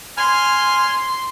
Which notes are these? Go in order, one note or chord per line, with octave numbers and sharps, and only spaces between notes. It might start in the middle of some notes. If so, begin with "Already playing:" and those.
G#5 C6 F6